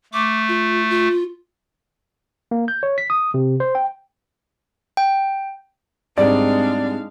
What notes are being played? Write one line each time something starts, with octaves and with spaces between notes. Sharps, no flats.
A3 D6
F4
F4
A#3
G6
C#5
B6
D#6
C3
C5
G5
G5
G#2 G3 G#3 C4 D4 G#4 D5 F5